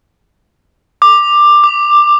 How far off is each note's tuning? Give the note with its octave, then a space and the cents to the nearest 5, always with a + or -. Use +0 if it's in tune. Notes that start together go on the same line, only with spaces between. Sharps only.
D6 +15
D6 +5